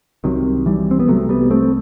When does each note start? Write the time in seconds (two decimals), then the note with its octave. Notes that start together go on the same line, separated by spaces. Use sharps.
0.24 C2 C3 D#3 F#3
0.66 E3 G3
0.91 C4
1.00 B3
1.08 C2 C3 F#3 A3
1.29 G3 B3
1.51 A3 C4